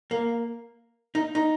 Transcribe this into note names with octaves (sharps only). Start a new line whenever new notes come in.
A#3
D#4
D#4